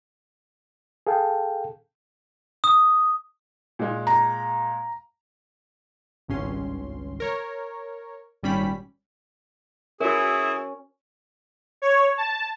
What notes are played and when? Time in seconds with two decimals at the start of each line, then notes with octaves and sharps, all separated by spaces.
1.07 G#4 A4 F5 G5 A5
2.64 D#6
3.79 A#2 G#3
4.07 A#5
6.28 G#1 C#2 G2 C#4 C6
7.20 A#4 C#5
8.43 G#1 A#2 G3 C#4 B5 B6
10.00 E3 B3 C#4 E4 F#4 G#4 A#4
11.82 C#5
12.18 A5